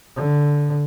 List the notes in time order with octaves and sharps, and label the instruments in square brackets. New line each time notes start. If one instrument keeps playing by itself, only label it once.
[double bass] D3